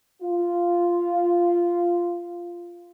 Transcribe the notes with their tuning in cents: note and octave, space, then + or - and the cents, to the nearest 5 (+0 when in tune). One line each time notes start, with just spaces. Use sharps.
F4 -5